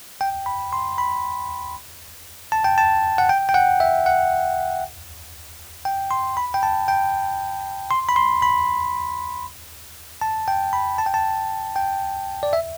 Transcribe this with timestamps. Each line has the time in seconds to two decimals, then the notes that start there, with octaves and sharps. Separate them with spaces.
0.21 G5
0.46 B5
0.73 C6
0.98 B5
2.52 A5
2.64 G5
2.78 A5
3.18 F#5
3.29 G5
3.49 G5
3.54 F#5
3.80 E5
4.06 F#5
5.85 G5
6.11 C6
6.37 B5
6.54 G5
6.63 A5
6.88 G5
7.91 C6
8.09 B5
8.16 C6
8.42 B5
10.21 A5
10.48 G5
10.73 B5
10.98 A5
11.06 G5
11.14 A5
11.76 G5
12.43 D5
12.53 E5